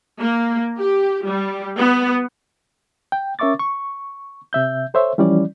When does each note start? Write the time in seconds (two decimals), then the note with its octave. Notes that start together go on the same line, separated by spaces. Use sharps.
0.21 A#3
0.79 G4
1.26 G3
1.78 B3
3.12 G5
3.39 C#4 A#4 E5 C#6 D6 A6
3.59 C#6
4.53 C3 E5 G6
4.94 A4 C5 C#5 E5
5.18 E3 F3 G3 C#4 E4 D5